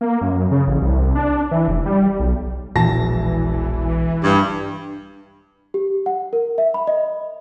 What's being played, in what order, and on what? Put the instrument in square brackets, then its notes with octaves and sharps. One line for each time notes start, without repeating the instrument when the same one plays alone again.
[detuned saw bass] A#3
F#2
C#3
A1
C2
D4
E3
F1
G3
B1
[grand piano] E1 A5 A#6 [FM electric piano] A#1 [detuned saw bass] E3
[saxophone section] G2
[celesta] G4
F#5
A#4
E5
B5
D#5